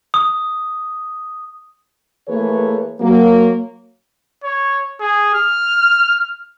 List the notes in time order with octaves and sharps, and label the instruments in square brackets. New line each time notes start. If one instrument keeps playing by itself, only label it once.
[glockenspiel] D#6
[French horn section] E3 A3 A#3 G#4 B4 C#5
F#3 A#3
[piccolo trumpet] C#5
G#4
F6